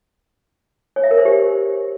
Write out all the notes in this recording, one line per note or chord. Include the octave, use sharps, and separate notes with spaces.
C#5
E5
A#4
C5
G4